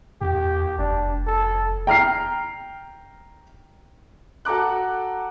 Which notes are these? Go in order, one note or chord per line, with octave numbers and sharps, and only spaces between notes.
E2 G4
F1 D4
A4
G5 A#5 F6 C7
F#4 A4 A#5 D6 F#6